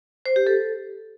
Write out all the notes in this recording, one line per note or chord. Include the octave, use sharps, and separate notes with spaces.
C5
G4
A4